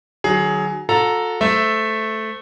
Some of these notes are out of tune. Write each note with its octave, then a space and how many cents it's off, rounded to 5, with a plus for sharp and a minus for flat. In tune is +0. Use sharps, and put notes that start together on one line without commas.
D#3 -40 F#3 +15 G#4 +15
F#4 -45 A4 +0 A#5 +0
A3 -5 C5 -20 E5 +0